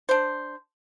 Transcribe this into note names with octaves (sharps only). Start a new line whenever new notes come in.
D4 C5